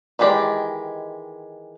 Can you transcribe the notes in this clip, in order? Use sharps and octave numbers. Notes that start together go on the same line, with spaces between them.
D#3 E3 G#3 G4 D5